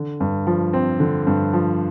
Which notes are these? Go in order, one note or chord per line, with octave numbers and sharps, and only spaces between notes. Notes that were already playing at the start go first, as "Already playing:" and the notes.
Already playing: D3
G2
F3
C4
D3
G2
F3